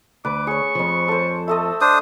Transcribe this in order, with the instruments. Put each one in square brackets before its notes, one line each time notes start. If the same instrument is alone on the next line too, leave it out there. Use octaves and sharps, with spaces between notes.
[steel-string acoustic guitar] D2 [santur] B4 [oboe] D6
[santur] G#4 C#5 [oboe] C#6
[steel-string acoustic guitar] F2 F3
[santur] A4 C5
[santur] A3 A4 D#5 [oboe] E6
[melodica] D4 C5 D#6